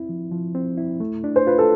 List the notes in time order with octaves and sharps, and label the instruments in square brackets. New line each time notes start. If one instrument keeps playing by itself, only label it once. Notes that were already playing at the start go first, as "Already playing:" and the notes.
Already playing: [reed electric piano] C4 E4
F3
F3
C4
E4
A3
D4
[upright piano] C5
[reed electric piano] F4 [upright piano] B4
[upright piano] A4